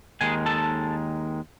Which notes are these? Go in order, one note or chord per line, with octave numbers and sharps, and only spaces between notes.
D#2 D#3 G#3 G#4 G#5
A4 A5